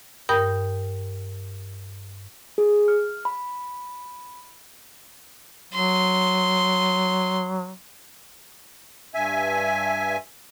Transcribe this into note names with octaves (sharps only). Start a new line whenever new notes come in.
G2 A#4 G5 D#6 G6
G#4
F6
B5
F#3 C6
G2 E5 G#5